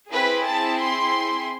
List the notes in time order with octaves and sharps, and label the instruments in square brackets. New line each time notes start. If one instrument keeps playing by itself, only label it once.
[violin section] C4 E4 G#4 B4
A5
C6